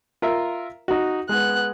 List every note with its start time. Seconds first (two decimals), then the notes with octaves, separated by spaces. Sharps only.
0.22 F4 A#4 E5
0.88 D#4 F#4
1.29 G#3 B3 F#6